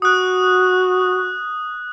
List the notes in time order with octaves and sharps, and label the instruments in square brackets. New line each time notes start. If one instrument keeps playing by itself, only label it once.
[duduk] F#4 [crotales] D#6 F#6